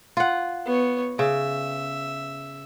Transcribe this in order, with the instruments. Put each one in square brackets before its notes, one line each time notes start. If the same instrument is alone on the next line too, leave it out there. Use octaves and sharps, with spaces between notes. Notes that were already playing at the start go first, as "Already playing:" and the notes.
[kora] F4 F#5
[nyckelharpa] B3 C#5
[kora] C#3 [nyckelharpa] E5